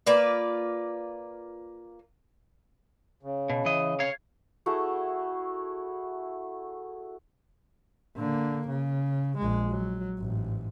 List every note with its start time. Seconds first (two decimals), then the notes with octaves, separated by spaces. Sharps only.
0.06 A#3 F4 B4 D5
3.23 C#3
3.50 B2
3.66 E3 D#5
4.00 C#5 F5
4.66 A3 E4 F#4 G#4
8.17 D3 A#3
8.68 C#3
9.38 A#1 G#3
9.70 F#3
10.18 A1 G#2